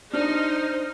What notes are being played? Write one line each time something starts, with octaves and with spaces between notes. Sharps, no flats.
D4 D#4 C5 F6